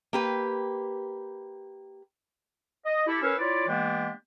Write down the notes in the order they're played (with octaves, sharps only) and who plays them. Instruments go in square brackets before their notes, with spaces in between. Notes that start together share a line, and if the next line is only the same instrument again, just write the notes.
[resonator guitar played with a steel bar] A#3 G4 B4
[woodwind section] D#5
E4 G4 A4
C#4 A#4 B4 C#5 F5 E6
E4 F4 C#5 D5
E3 G#3 A#3 B3 D4 G4